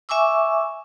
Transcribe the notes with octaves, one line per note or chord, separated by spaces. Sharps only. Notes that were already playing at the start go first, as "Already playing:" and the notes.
E5 G#5 C#6 D6 E6